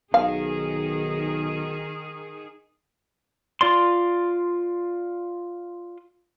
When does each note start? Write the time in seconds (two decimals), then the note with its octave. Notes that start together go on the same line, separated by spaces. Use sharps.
0.14 B1 D#3 G#4 F5
3.61 F4 D5 C6